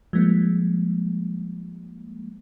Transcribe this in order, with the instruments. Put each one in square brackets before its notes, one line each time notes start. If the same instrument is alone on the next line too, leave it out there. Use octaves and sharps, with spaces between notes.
[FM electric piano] F3 G3 G#3 A#3